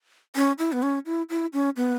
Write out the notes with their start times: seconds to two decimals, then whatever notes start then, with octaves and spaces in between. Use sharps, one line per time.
0.36 C#4
0.59 E4
0.72 B3
0.83 C#4
1.06 E4
1.30 E4
1.53 C#4
1.77 B3